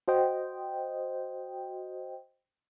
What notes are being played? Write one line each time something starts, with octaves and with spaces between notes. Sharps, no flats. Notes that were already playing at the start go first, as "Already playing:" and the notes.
F#4 C5 D#5 G5